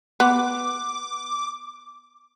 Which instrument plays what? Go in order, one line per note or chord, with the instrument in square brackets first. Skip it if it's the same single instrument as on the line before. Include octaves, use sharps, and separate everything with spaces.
[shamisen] B3 [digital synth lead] D6